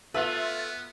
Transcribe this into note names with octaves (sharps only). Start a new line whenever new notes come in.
A3 B3 F4 B4 E5 E6 D#7